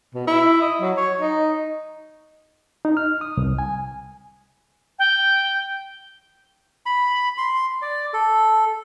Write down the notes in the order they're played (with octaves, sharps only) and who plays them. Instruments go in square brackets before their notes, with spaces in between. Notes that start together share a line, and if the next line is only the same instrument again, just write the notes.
[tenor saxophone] B2
E4
D#5
F#3
C#5
D#4
[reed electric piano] D#4
F6
D#6
C2
G#5
[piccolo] G5
[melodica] B5
C6
D5
A4